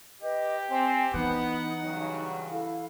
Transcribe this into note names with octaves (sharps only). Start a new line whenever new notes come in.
G4 B4 D#5
C4 G#5
E3 B3 D#4 F#5
G2 C#3 F#3
E4 A4 F5